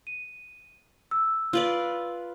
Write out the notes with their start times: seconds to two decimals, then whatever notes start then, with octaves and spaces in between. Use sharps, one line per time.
0.07 D#7
1.11 E6
1.53 F4 B4 D5